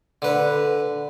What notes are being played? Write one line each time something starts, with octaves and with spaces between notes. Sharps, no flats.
D3 B4